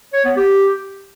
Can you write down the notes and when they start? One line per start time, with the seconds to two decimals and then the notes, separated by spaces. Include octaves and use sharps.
0.13 C#5
0.25 B3
0.36 G4